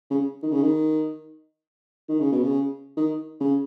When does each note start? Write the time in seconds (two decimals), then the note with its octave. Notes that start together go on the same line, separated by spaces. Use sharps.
0.10 C#3
0.43 D#3
0.52 C#3
0.62 D#3
2.09 D#3
2.20 C#3
2.32 B2
2.44 C#3
2.97 D#3
3.40 C#3